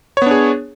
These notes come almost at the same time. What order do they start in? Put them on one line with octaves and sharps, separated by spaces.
C#5 B3 D4 G#4